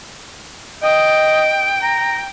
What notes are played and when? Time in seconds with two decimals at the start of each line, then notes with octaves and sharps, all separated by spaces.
0.83 D#5 G5
1.83 A#5